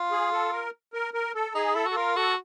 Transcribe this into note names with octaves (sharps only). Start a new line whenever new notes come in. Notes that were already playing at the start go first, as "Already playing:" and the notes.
Already playing: F4
G#4
A4
A#4
A#4
A#4
A4
D#4 G#4
E4 A4
F#4
A4
F4 A#4
F#4 A4